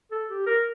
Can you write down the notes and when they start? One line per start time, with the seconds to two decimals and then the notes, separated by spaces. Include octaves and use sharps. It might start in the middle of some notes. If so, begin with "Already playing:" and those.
0.11 A4
0.29 G4
0.46 A#4